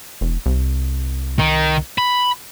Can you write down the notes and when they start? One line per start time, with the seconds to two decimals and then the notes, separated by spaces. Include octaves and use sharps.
0.21 E1
0.46 C2
1.39 D#3
1.98 B5